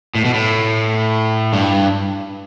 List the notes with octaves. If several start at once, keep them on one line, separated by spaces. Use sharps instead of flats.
A2
B2
A2
G2